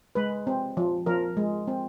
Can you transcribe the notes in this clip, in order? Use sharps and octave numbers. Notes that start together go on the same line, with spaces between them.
G#3 B4
C4
F3
F3 A#4
G#3
C4